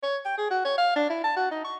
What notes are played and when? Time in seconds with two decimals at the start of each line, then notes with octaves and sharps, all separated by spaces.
0.03 C#5
0.25 G5
0.38 G#4
0.51 F#4
0.65 C#5
0.78 F5
0.96 D4
1.10 E4
1.24 A5
1.37 F#4
1.51 D#4
1.64 C#6